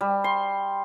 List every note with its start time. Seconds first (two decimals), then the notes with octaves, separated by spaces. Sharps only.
0.01 G3
0.24 C6